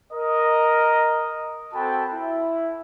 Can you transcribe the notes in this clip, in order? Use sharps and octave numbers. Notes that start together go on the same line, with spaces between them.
A#4 D#5
C4 F#4 A4 G5 A5 B5
E4